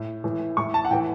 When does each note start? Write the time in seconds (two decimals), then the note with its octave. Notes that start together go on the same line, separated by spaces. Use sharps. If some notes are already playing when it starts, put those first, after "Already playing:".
Already playing: A2
0.24 A2 E3
0.57 A2 E3 C#6
0.74 A5
0.85 F#5
0.91 A2 E3 G5